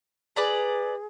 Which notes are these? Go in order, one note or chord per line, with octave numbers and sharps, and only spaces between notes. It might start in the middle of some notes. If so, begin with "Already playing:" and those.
G#4 B4 D5 A#5